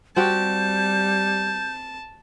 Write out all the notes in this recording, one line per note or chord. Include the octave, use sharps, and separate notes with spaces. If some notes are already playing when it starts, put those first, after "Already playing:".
G3 C4 F#4 G4 A5 G6